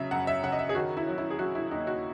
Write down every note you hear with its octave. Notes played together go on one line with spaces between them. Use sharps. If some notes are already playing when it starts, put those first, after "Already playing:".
Already playing: C#3 F#3 E5
F#2 F#5
E5
C#3 F#5
D#5
E5
G#4
D#3 F#4
E4
F#3
E4
G#4
F#3 F#4
E4
D#2 D#4
F#4